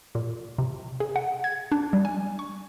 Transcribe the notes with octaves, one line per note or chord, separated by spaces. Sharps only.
A#2
C3
G#4
F#5
G#6
D4
G3
G#5
C#6